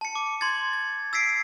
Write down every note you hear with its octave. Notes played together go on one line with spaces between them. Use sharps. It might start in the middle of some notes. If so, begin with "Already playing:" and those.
A5 C#7
D6
C6 G#6 A6 C#7
A6
E6 A6 B6 C7 D7